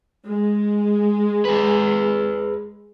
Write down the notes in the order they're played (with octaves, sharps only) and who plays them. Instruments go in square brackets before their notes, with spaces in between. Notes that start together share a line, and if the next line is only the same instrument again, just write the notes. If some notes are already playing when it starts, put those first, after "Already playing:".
[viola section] G#3
[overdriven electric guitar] G#4 B4